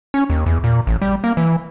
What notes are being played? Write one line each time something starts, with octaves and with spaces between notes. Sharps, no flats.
C#4
D#2
E2
A#2
A1
G3
A#3
E3